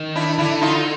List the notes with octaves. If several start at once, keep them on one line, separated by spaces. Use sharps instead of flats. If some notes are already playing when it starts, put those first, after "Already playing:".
Already playing: D#3
D4 E4
D3 D4 E4
D#4 F4